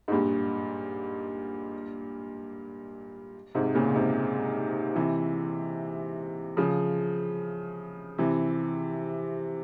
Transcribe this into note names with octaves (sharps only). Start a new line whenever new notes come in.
G#2
G2 A#2
G#2 C3
A#2 C#3
G#2 C3
C3 E3
C#3 F3
C3 E3